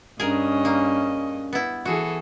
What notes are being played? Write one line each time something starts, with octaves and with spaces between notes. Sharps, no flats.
G2 C#4 G#4 A#4 D#5
A#3
B3 E4
E3 F#4 G#4 A4